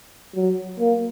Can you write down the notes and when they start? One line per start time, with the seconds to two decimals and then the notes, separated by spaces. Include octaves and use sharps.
0.35 F#3
0.80 A#3